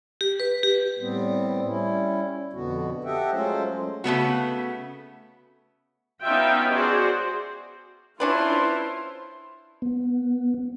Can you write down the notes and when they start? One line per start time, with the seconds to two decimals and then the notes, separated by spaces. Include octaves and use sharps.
0.21 G4
0.40 B4
0.63 G4
0.99 A2 G3 B3 C4
1.65 G3 C#4 E4
2.53 F2 B2 D3 B3 F#4
3.04 G4 A4 D#5 E5 F#5 G5
3.31 F#3 G#3 A3 C#4 F4 C5
4.04 C#3 A3 B3 F#4
6.23 B3 C#4 D#4 F4 E5 G5
6.73 F#4 G#4 C5 D5
8.20 C#4 D4 E4 F4 B4 C5 A5 C6
9.82 B3